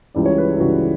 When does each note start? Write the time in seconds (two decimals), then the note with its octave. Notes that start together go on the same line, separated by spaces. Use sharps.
0.14 C#2 C#3 E3 G3 D5
0.26 C#5
0.38 B4
0.54 E4
0.60 C#2 C#3 E3 G3 F#4